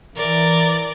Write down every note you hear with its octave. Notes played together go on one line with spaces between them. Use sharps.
E3 A#4 D5